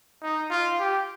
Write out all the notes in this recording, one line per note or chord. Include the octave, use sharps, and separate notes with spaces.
D#4
F4
G4